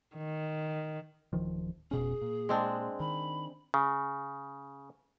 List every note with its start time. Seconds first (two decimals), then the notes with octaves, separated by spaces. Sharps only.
0.17 D#3
1.33 D1 D#3 F3
1.91 F1 B2 C#4 G#4
2.22 A#2
2.49 G#3 C4 D4
3.00 D#3 B5
3.74 C#3